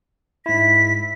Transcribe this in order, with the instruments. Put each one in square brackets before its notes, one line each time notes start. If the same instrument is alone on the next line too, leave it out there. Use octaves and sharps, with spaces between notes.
[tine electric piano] G#2 E4 [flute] B6